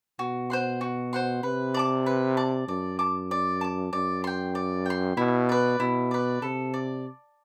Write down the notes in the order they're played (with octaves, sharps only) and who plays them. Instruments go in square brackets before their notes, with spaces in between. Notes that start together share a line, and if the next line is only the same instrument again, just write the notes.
[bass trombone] B2 [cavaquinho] F#4
[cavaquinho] C5 F#5 C6
F#4
C5 F#5 C6
[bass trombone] C3 [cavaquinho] B4
[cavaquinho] D5 A5 D6
B4
D5 A5 D6
[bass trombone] F#2 [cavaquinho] D5
[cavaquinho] A5 D6
D5
A5 D6
[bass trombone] F#2 [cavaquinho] D5
[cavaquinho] G5 C6
D5
G5 C6
[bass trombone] B2 [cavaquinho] E4
[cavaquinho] B4 D5
[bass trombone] B2 [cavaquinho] E4
[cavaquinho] B4 D5
[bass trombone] C3 [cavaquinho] A4
[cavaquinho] D5